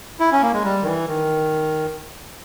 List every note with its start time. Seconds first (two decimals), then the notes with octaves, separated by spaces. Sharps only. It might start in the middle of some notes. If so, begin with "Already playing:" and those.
0.20 E4
0.32 C#4
0.42 A#3
0.53 G#3
0.64 G3
0.82 D#3
0.86 E3
1.08 D#3